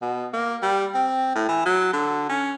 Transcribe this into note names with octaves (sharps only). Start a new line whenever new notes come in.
B2
A#3
G3
C4
A2
E3
F#3
D3
C#4